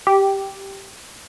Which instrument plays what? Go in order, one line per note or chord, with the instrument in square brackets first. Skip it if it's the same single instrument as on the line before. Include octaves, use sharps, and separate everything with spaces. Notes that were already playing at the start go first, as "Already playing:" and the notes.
[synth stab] G4